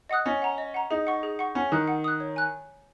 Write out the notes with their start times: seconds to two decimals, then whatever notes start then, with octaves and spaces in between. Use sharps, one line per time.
0.09 D#5 F#5 D#6 F#6
0.26 C#4 D#5
0.42 F#5 A#5
0.58 D#5
0.74 F#5 A#5
0.90 D#4 G#4
1.07 F#5 C#6
1.23 G#4
1.39 F#5 C#6
1.55 C#4 F#5
1.72 D#3 D#6 F#6
1.88 F#5
2.04 D#6 F#6
2.20 C#5
2.36 G#5 F#6